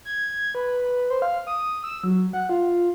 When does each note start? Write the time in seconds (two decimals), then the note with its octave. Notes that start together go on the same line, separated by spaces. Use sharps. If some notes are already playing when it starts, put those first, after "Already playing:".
0.05 G#6
0.55 B4
1.10 C5
1.22 F5
1.47 D#6
1.83 E6
2.04 F#3
2.33 F#5
2.49 F4